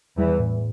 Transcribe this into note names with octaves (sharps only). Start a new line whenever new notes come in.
E2 E3 G3
A2